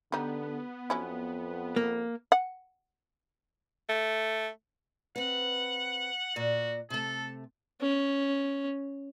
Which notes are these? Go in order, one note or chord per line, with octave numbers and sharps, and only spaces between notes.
D3 G3 B3 D#4
F2 F#3 C#4 E4
A#3
F#5
A3
C4 B4 F#5
A#2 F#4 D5
C3 A3 A4
C#4